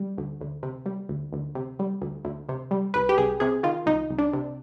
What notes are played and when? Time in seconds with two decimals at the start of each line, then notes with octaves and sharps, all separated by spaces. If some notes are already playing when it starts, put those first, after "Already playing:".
Already playing: G3
0.18 D2
0.41 D2
0.63 C3
0.86 G3
1.09 D2
1.33 D2
1.55 C3
1.79 G3
2.01 D2
2.24 D2
2.49 C3
2.71 G3
2.94 C2 B4
3.09 G4
3.18 C2 G#4
3.40 C3 G#4
3.63 D#3 F4
3.86 C2 D#4
4.10 C2
4.18 D4
4.33 C3